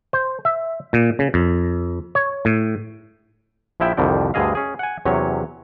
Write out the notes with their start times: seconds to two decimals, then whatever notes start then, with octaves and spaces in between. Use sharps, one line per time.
0.13 C5
0.45 E5
0.93 A#2
1.19 C#3
1.34 F2
2.15 C#5
2.45 A2
3.80 A#1 F3 E4 E5 G5
3.97 C2 F2 D3 D#3 G3 G5
4.34 D2 G2 D3 G#4 D#5 F5
4.55 C#4 G#4
4.79 F#5 G#5
5.05 E2 C3 F#3 C#4 C#5